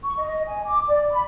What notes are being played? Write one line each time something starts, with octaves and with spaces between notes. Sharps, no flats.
C#6
D#5
G#5
D6
D5
B5